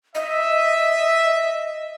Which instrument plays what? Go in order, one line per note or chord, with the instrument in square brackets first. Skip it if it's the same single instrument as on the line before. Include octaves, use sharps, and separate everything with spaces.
[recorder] D#5 [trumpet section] E5